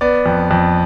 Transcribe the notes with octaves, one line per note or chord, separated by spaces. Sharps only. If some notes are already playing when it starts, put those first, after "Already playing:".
B3 D5
F2
F2